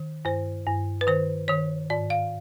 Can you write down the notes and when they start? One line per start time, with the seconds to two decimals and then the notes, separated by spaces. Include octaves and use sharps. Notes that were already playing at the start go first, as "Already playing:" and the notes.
Already playing: D#3
0.25 G2 C5
0.66 G2
1.01 B4
1.07 D#3 C5
1.48 D#3 C#5
1.90 G#2 D5
2.10 F5